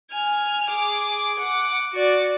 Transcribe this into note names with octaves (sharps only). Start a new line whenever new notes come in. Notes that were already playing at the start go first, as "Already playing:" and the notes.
G#5 F6
G#4 D6
F#5 D6
F#4 D5